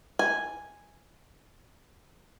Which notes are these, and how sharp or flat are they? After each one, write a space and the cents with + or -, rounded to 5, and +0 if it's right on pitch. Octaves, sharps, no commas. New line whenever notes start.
G#5 -5